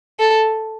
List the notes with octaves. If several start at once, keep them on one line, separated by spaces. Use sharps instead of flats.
A4